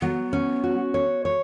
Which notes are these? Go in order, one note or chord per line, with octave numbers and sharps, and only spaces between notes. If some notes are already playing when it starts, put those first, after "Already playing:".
F#3 B3
C#4
F#4
C#5
C#5